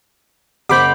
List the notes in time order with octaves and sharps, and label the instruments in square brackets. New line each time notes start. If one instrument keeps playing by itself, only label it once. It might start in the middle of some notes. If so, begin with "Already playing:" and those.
[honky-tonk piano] F#1 C5 F#7 [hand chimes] F#5 B5 G6 [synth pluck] D6 B6